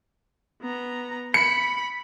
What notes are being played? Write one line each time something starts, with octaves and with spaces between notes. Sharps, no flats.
B3 A#5
B5 C#7